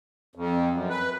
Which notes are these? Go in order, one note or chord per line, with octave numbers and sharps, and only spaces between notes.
F2
F#2
B4